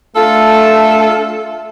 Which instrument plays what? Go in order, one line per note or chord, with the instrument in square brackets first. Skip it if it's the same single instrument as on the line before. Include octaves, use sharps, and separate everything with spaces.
[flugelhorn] A3 [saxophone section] D4 F4 A4